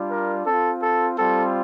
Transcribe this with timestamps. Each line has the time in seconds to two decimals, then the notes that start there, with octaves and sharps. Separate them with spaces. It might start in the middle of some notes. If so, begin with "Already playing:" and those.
Already playing: G3 D4 F4
0.11 A#4
0.46 C4 F4 A4
0.82 A4
1.18 G3 C4 F4 A4